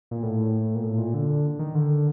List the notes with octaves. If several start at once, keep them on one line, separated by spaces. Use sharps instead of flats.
A#2
A2
A#2
A2
A#2
D3
D#3
D3